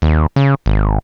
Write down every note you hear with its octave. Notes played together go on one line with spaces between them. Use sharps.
D#2
C#3
G#1